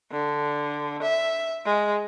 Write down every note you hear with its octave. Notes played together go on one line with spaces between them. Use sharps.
D3
E5
G#3